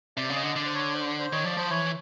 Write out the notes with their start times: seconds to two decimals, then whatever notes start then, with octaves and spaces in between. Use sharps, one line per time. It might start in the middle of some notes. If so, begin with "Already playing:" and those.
0.17 C3 D5
0.30 C#3
0.36 D#5
0.43 D3
0.55 D3 D5
0.66 C5
0.74 C#5
0.94 C5
1.19 C5
1.32 D#3 C#5
1.44 F3 D5
1.57 F3 C5
1.70 E3 C#5